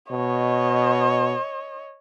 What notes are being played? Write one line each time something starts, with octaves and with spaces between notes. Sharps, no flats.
B2 C#5 D#5